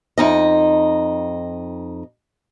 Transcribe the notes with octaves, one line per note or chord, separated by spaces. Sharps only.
F2 D#4 D#5